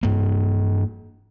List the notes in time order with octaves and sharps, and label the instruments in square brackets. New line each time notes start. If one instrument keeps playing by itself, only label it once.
[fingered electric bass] G2 A#3